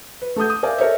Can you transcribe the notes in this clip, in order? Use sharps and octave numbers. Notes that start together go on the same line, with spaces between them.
B4
A3 A4 F#5 D#6 G6
D#6
A#4 D5 E5 F5 G#5
A4 A#4 C#5 D#5 E5